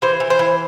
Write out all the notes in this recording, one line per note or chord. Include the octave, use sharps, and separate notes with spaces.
E3 C5
E3
C5
E3